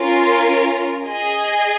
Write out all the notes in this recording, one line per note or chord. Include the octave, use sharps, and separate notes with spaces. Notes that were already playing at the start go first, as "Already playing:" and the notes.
Already playing: C#4 F4 A#4
G#4 D#5 G#5